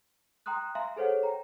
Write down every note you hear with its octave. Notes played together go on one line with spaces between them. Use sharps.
G5 A#5 C6 D#6 F#6
E5 F5 G#5 A#5 C6
G#4 A4 C5 C#5 F#5
G5 A#5